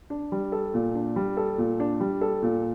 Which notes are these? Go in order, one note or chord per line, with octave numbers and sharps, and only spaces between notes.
D4
G3
A4
A#2
D4
G3
A4
A#2
D4
G3
A4
A#2